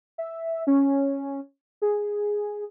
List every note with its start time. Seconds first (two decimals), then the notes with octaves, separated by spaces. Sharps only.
0.18 E5
0.67 C#4
1.82 G#4